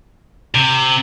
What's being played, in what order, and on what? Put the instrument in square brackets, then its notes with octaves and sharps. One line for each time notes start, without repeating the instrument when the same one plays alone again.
[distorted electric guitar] C3